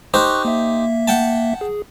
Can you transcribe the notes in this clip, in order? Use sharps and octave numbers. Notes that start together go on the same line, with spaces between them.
D#4 G4 C5 C#6 F#6
A#3 E5
F#5 G5 A5
G#4